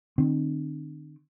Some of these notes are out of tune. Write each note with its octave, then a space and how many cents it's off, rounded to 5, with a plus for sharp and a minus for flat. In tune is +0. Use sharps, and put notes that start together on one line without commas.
D#3 -45 C4 +0